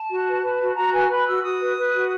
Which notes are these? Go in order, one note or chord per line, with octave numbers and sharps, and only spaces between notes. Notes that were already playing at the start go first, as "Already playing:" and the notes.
Already playing: A5
F#4
B4
B4
F#4
F#4 A#5
B4 G#5
B4 B5
F#4 E6
F#4 D#6
B4
B4
F#4